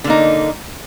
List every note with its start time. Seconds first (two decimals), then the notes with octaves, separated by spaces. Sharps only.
0.04 D3
0.07 A#3
0.10 D#4